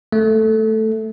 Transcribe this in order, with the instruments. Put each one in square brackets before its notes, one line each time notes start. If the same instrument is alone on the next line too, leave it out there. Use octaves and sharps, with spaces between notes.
[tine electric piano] A3